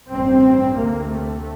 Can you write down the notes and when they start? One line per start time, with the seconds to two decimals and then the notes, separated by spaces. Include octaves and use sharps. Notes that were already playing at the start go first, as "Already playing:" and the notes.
0.10 A1 G2 C4
0.76 D2 C3 A#3
1.10 A3